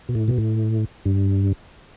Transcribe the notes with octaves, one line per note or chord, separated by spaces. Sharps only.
B2
A2
B2
A2
G2